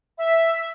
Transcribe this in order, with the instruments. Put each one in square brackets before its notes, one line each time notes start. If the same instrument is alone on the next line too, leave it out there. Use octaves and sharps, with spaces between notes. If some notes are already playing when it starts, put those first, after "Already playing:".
[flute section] E5